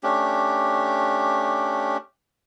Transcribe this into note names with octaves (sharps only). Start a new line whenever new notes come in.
A3 C#4 D4 G4